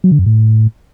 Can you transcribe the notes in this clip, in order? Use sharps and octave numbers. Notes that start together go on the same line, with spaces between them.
F#3
D3
F#2
A2